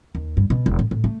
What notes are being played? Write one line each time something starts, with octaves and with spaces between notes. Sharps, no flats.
D#2
G2
B2
E1
A2
A2
A3